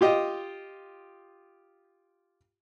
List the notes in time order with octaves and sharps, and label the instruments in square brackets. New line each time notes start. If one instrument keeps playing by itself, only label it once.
[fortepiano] F4 G4 D#5